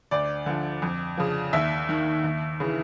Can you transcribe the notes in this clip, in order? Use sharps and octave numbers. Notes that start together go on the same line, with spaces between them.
D2 D5
D3 F3
F2
C#3 F3
D#2 E5
D#3
D#2
C#3 E3